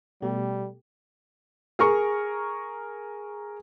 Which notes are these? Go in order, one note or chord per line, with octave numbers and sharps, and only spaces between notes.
B2 G3 A3 G4
G#4 A#4 C#6